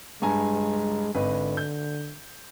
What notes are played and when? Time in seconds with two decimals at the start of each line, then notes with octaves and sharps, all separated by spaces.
0.22 G2 G#3 G#5 A#5
1.15 G#1 D3 B4 D#5
1.57 G6